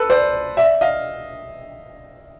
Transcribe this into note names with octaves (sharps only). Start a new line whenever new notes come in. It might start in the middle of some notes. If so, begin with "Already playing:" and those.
Already playing: A4 B4
C5 D5
D5 E5
D#5 F5